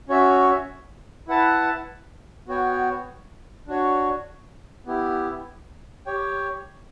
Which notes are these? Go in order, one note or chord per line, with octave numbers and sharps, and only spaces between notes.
C#4 F#4 C#5 E5
E4 B4 F#5 A5
B3 F#4 C#5 G5
D4 F#4 C#5
B3 E4 G4
G4 C#5 G5